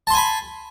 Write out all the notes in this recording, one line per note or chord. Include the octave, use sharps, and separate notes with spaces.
G#5 A5 B5 C6